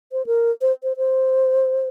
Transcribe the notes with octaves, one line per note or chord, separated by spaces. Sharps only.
C5
A#4
C5
C5
C5